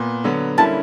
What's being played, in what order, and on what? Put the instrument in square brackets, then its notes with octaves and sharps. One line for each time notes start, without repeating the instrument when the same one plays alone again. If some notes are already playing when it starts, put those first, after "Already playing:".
Already playing: [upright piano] A#2 B3
D3 F#3 B3
[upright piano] D3 G3 A#3 C#4 E4 [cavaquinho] A5